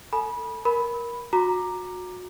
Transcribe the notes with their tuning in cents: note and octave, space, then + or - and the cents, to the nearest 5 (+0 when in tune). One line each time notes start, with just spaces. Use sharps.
A4 +20 G#5 +35 B5 -25
A#4 +10 B5 +0
F#4 -25 A#5 +0 D6 +15